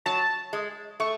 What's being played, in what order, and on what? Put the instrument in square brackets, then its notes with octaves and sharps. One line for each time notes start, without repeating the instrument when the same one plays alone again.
[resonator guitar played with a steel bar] F#3 [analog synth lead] A5
[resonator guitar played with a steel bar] G#3
[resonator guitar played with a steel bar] A3 [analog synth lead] C#6